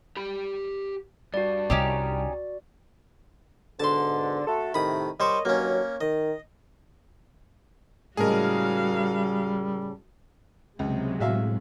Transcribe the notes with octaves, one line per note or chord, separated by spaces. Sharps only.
G4 B5
G2 F#4 D5
C2 C#4 D#4 G4
G#2 B2 D3 A5 C6
A3 F#4 A4
A2 C3 D#3 B5 D#6
G3 A#4 C5 C#5 D#5 C#6
G2 D#3 F#3 A#3 C#4
D#3 D#5
A2 C#3 G3 G#3 F#4 G#4 A#4 F5
C#2 C3 F#3 G#3
A2 F#4 E5 F5